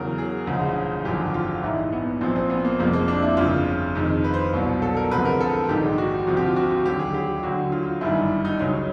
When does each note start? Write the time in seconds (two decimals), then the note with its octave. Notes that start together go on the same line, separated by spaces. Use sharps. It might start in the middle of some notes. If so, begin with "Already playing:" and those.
Already playing: E2 C#3 F#3 A#4
0.18 G#4
0.47 E1 D2 C#3 F3 G#3
1.05 G#1 F#2 D3 F3 G4
1.34 F4
1.63 A#1 G#2 E3 E4
1.92 B3
2.21 A#1 A#2 F3 C4
2.36 C4
2.50 B3
2.65 A#3
2.79 F1 F2 C3 F3 G#3 A#3
2.93 A#3
3.08 D4
3.22 E4
3.37 G1 F2 C#3 F4
3.95 F2 C3 D#3 G#3
4.24 B4
4.34 C5
4.53 C2 B2 F#3
4.82 A4
4.97 A#4
5.11 D2 C3 F3 G#3 B4
5.25 A#4
5.40 A4
5.69 A#1 G#2 D#3 G#3 G4
5.98 F#4
6.27 D2 C3 F3 F#4
6.37 G4
6.46 F4
6.56 F#4
6.71 F#4
6.85 D#2 D3 F#3 G4
6.99 G#4
7.14 G4
7.43 D2 D3 F#3 F#4
7.72 F4
8.01 G1 F#2 D#3 G3 E4
8.45 D#4
8.59 C#2 C#3 F#3 C#4